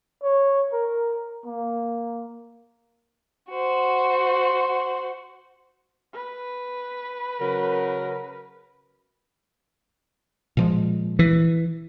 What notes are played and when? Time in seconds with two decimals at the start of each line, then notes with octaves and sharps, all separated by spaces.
0.23 C#5
0.73 A#4
1.45 A#3
3.50 F#4 C5
6.13 B4
7.39 C#3 F#3 A#4
10.57 A#2 F3 G#3
11.19 E3